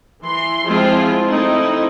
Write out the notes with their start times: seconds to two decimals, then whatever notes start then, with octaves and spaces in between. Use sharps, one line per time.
0.23 E3 C6
0.65 F3 G#3 C4 E4 F4
1.28 A3 C4 D#4 E4